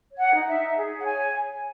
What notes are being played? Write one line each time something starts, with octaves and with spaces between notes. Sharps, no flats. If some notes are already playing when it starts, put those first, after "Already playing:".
C#5
F#5
D#4
F#5
E5
D#4
G#4
C#5 F#5
G#5